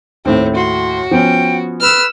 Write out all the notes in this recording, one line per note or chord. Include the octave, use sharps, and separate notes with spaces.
D#2 A2 C4
F#4 C6
F3 B3 C#4 G5
B4 E6 F6